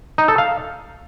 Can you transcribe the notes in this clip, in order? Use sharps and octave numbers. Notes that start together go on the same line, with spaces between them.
D#4
A4
F5